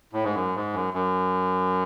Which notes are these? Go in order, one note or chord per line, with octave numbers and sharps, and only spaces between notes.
A2
G#2
F#2
G#2
F#2
F#2